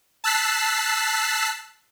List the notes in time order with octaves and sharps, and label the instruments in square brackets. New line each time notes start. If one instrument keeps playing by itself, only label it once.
[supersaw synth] A5 E6 F#6 B6 C7